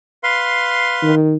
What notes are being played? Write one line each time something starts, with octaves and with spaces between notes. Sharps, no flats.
B4 F5 C6
D#3